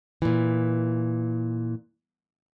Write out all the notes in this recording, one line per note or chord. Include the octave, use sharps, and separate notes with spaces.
A#2 E3